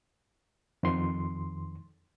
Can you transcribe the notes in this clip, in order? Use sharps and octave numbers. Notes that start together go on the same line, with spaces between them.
F2 D#3 C6